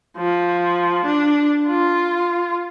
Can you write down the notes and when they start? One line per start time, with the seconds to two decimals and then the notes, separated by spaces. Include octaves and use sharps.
0.18 F3
1.05 D4
1.68 F4